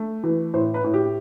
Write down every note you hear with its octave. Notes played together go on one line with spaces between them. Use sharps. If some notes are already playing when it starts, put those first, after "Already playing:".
Already playing: A3
E3
A2 C5
B4
A2
G4